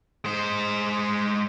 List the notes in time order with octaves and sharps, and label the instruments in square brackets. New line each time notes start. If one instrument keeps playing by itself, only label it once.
[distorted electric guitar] G#3 C5